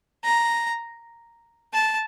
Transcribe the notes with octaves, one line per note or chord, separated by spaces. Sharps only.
A#5
A5